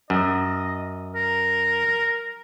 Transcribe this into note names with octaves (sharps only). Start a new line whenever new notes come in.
F#2 D#5
A#4